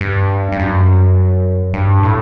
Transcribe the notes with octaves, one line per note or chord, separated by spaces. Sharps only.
G2
G2
F#2
G2
A2